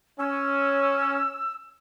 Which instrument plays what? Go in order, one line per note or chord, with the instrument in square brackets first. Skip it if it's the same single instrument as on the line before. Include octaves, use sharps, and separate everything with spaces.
[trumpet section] C#4 [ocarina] E6